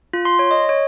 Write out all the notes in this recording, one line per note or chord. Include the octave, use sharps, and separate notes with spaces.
F4
C6
C#5
D#5
C#5